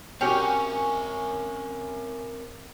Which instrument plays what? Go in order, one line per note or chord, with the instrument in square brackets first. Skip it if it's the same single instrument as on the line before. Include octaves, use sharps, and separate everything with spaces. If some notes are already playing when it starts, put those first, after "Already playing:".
[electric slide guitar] C4 A#4 [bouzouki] C#4 [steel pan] F#4 G4 G5